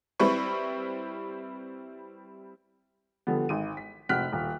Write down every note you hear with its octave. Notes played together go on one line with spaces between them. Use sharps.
G3 C4 E4 B4 C#6
D3 F3 G3 B3
G#1 D#7
B6
F1 C4 F#4 F6 F#6 B6
D#1